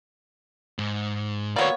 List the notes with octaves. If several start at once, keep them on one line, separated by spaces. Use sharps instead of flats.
G#2
A#3 B3 F#4 C#5 D5